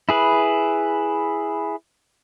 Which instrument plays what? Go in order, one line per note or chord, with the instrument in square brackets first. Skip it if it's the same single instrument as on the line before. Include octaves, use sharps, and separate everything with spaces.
[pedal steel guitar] E4 G#4 B4